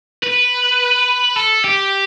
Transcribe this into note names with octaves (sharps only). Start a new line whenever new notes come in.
B4
A4
G4